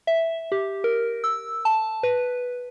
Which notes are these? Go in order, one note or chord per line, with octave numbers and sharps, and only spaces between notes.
E5
G4
A#4
E6
A5
B4